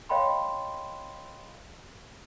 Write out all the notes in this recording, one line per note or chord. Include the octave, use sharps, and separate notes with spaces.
C#5 D#5 F5 G5 B5 C6